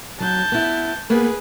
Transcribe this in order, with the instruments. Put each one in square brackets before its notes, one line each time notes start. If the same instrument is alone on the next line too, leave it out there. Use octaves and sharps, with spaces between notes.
[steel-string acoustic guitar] F#3 [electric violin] A5 G6
[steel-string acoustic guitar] B3 E4
[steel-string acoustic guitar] A#3 B3 [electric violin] G#4 B4